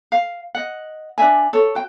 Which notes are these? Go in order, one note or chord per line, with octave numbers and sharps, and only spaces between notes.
F5
D#5 F#5
D4 D5 E5 G#5
A4 C#5
F#4 G5